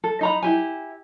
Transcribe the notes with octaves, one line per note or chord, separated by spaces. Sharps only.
A4
D#4 A#5 B5
E4 G4 G#5